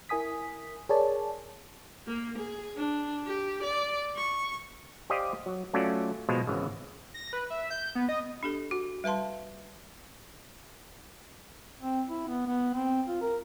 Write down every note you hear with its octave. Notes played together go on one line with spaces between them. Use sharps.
E4 A#4 G#5 D#6 B6
G#4 A#4 C#5 D5 G#5 A5
A#3
G#4
D4
G4
D5
C#6
G4 C5 D5 D#5 F5
F#3
F#3 A3 C#4 F4 F#4 D5
B1 B2 F3 G#3 C5 F5
G#1 C#3 E3
A#6
B4
E5
G6
B3
D#5
D4 G4 A4
F#4
G3 B4 F5 A5 C6
C4
E4
B3
B3
C4
F4
A#4